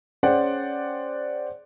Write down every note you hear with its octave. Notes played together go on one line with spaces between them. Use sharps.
C#4 G#4 C5 D5 F#5 G5